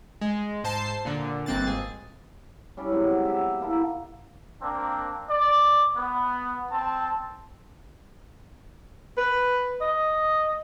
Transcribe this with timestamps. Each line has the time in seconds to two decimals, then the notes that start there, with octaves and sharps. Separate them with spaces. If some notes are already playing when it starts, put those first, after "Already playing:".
0.21 G#3
0.64 G#2 C5 A5 C7
1.05 A#2 D3
1.46 G1 A#3 C4 F#6 A6
1.67 G#1 G#4
2.77 G3 C#4 E4 D5
2.92 C3 F#3 G#3 B3
3.25 G4 B4 E5
3.61 A#3 E4 A4
4.62 A#3 C4 D4
5.29 D5
5.96 B3
6.72 C4 A5
9.18 B4
9.81 D#5